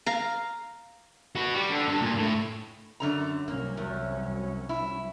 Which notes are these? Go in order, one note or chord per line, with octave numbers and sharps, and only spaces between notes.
F5 A#5
F#4 B4
G3
D3
G2
A#2
A2
F#2 D3 A#5
C2 F#3 A#3 C#4
E2
E4